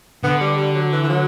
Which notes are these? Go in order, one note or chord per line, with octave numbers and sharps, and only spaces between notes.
D3 B3
G3
G3
F#3
E3
E3
F#3